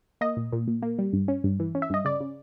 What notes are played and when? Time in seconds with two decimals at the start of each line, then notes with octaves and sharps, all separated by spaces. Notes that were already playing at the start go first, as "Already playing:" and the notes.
0.21 A#3 D#5
0.37 A#2
0.52 A#2
0.68 A#2
0.82 A#3
0.99 G3
1.13 G2
1.28 C#4
1.44 G2
1.60 E3
1.75 C#4
1.82 E5
1.90 G2 D#5
2.05 C#3 D5
2.20 C#3